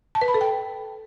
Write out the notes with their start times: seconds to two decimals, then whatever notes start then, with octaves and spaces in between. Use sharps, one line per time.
0.15 A5
0.21 B4
0.28 B5
0.34 A4
0.41 G5